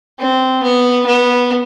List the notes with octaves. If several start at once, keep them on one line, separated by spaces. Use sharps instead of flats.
C4
B3
B3